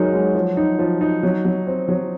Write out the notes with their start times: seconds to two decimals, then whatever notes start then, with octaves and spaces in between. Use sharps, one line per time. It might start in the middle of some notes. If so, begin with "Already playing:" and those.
Already playing: F#3 G#3 D#4 A#4
0.13 G#3
0.35 F3
0.57 D#4
0.79 F3
1.01 D#4
1.23 F#3
1.45 F#3
1.67 C4
1.89 F#3